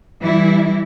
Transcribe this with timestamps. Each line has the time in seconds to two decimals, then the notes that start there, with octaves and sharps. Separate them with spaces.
0.22 E3 G3 E4